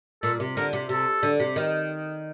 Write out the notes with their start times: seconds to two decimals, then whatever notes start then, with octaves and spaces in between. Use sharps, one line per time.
0.23 A#2 A4
0.40 C3
0.56 D3 A#4
0.73 C3
0.89 C3 A4
1.23 D3
1.40 C3
1.56 D#3